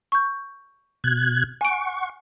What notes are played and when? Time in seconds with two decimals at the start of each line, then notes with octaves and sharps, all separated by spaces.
0.12 C#6 G6
1.04 B2 F#6 G#6
1.61 F#5 G#5 C#6 D7